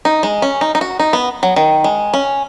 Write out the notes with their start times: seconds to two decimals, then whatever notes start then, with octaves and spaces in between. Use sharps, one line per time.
0.05 D#4
0.23 G#3
0.42 C#4
0.61 D#4
0.75 D#4
0.81 F#4
0.99 D#4
1.13 B3
1.43 F#3
1.56 D#3
1.84 G#3
2.14 C#4